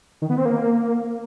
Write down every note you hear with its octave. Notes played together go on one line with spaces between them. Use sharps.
D#3
B3
C4
A#3